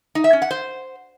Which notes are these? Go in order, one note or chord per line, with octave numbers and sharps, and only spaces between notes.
D#4
E5
C#4
F#5
C5